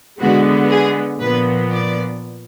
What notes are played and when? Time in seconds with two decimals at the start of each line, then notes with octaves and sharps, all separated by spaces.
0.19 D3 G#3 B3 F#4
0.70 G#4
1.20 A#2 F3 B3 B4
1.70 D5